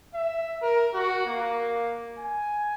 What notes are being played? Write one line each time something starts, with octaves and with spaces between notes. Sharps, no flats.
E5
A#4
F#4
A#3
G#5